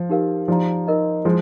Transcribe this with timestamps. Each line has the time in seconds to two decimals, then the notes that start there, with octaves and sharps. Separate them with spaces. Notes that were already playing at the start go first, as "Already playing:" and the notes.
Already playing: F3
0.09 D#4 G4 A#4 F5
0.48 F3 D#4 G4 D5 F5 A#5
0.87 D#4 A#4 D#5 A#5
1.25 F3 G#3 G#4